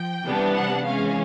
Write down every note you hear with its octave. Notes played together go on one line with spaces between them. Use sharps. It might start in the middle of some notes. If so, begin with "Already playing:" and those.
Already playing: F3 G5
C3 E3 G3 B3 D4
F#5
E3 G#3 C#4 F5